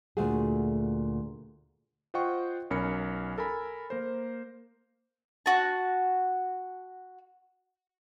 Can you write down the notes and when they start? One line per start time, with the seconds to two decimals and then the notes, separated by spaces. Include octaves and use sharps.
0.17 D2 A#2 A3 F#4 G#4
2.14 F4 C5 D#5 F#5 G5 C#6
2.70 B1 C#4 A#4 B5 C#7
3.38 A4 A#4 G#5 B5
3.90 A#3 A#4 C5
5.46 F#4 A5